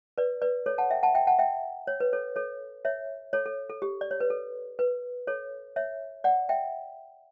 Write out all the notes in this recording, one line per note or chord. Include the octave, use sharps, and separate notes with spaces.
B4 D5
B4 D5
A4 C#5
F#5 A5
E5 G5
F#5 A5
E5 G5
F#5 A5
E5 G5
C#5
B4
A4 C#5
A4 C#5
C#5 E5
A4 C#5
A4
A4
G4
D5
C#5
B4
A4
B4
A4 C#5
C#5 E5
D5 F#5
E5 G5